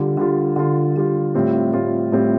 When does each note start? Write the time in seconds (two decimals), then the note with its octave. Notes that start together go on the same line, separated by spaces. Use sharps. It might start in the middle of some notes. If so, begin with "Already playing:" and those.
Already playing: D3 G3 F4
0.17 D3 G3 F4
0.56 D3 G3 F4
0.96 D3 G3 F4
1.34 A2 G3 C4 F4
1.73 A2 G3 C4 F4
2.12 A2 G3 C4 F4